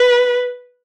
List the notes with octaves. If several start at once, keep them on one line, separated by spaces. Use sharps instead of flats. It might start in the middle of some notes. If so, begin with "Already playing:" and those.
Already playing: B4